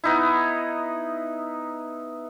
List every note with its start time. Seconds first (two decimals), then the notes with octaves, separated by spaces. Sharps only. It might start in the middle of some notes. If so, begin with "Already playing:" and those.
0.04 B3 D#4 E4